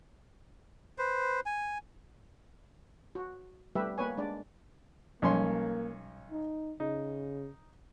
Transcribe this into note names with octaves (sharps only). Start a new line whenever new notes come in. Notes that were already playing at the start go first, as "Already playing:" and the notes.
B4 C5
G#5
F#4
G3 A3 B3 G4 B4 E5
A#3 B3 B4 C#5 G#5
G#3 D4 D5
B1 F3 G3 A#3 C#4 C6
D#4
C#3 D#4